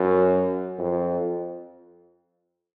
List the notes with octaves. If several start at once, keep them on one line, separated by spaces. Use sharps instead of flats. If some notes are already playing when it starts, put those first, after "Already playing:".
Already playing: F#2
F2